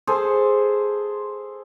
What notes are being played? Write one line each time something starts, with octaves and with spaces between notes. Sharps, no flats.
G#4 A4 C5